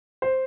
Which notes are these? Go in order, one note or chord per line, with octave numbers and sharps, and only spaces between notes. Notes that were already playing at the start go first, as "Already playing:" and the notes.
C5